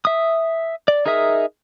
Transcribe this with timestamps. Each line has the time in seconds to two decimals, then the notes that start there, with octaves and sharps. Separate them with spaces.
0.05 E5 D#6
0.88 D5
1.06 D#4 G#4 A#4 E5 D#6